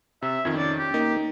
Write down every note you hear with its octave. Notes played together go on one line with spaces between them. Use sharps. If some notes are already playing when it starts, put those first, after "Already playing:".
C3 E5
F2 D#3 C4 F4 G#6
C#4 D5
G4
A#3 D#4 A#4